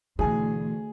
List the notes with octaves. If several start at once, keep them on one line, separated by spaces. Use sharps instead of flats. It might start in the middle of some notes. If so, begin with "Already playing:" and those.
D2 B2 E3 G#4 G#5